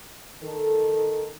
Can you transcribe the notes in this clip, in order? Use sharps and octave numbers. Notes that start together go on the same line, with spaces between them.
D#3 D#4 A4